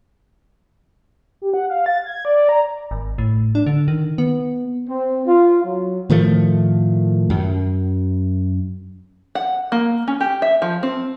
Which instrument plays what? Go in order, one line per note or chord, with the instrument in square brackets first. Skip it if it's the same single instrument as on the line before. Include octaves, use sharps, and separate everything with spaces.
[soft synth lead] G4
F#5
F5
A6
G#6
D5
A#5
[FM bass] G#1
A2
D4
D3
D#3
B3
[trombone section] C4
F4
F#3
[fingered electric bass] A2 D#3 F3 A3
F#2
[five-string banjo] F#5
A#3
C#4
G4
E5
F3
C4